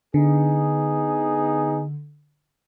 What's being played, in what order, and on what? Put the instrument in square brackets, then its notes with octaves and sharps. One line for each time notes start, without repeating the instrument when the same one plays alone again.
[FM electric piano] D3 [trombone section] B3 D#4 G#4